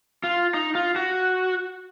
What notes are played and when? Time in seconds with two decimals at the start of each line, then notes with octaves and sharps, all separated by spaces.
0.24 F4
0.54 D#4
0.75 F4
0.96 F#4